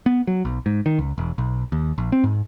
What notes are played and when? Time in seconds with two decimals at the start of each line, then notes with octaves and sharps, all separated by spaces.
0.06 B3
0.27 F#3
0.45 B1
0.66 G#2
0.86 D#3
0.99 C#2
1.18 E1
1.38 B1
1.72 D#2
1.98 A#1
2.12 C4
2.24 G#2